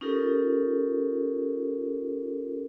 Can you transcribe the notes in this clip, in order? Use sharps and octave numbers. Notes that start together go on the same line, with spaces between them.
C#4 D#4 F4 G4 A4 A#4